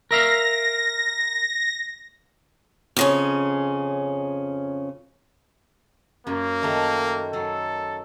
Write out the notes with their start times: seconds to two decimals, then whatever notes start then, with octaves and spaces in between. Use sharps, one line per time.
0.11 A#4 E5 F5 A#6
2.97 F2 C#3 C#4
6.27 F#2 A#3
6.62 D#3 A3 D#4
7.33 F#3 G#4 A4